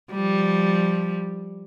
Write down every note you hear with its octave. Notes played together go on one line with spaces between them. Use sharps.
F3 G3